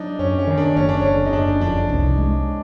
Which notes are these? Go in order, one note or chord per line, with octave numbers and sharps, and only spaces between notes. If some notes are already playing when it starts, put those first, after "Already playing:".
Already playing: F#3 D4 D#4
F#2 C#4
C#4
D#3
D4
F#1 C#4
D4
D3 C#4
D#4
F#1 D4
F2 D4
C2
G#3